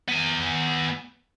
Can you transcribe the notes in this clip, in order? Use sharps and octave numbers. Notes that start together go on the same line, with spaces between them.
B3 G#5